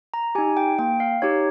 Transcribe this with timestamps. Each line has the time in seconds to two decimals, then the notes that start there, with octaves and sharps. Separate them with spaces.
0.14 A#5
0.35 G4 G#5
0.38 D#4
0.57 G5
0.79 A#3 G5
1.00 F5
1.22 D#4 G4 C#5